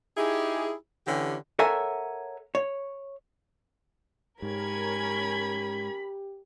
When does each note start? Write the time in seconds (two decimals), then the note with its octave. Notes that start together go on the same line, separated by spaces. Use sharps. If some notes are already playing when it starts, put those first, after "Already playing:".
0.17 D#4 E4 G4 G#4
1.07 D3 E3 C#4 G4
1.59 A4 A#4 C#5 E5 F#5 G#5
2.55 C#5
4.42 G#2 C#4 G4 A#4 B5 G#6